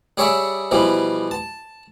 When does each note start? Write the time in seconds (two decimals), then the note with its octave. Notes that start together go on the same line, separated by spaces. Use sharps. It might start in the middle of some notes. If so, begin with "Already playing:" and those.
0.17 G3 G#4 C#5 D5 E5
0.71 B2 E3 F3 G3
1.31 A5